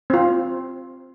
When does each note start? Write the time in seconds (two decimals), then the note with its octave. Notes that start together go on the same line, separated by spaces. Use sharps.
0.10 C4 F4